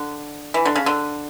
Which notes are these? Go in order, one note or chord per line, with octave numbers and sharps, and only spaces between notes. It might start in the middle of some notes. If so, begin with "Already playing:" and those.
Already playing: D3
E3
D3
C#3
D3